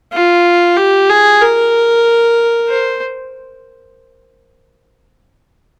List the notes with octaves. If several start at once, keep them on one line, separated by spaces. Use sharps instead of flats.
F4
G4
G#4
A#4
C5